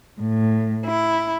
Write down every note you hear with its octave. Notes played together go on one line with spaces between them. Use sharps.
A2
E4